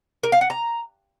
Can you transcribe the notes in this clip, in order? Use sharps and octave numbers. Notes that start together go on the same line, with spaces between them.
A#4
F5
F#5
A#5